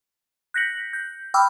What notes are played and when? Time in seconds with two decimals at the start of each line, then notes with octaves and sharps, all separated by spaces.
0.54 F#6 G6 A#6 B6 C#7 F#7
0.93 G6
1.34 G5 B5 D6 E6 F6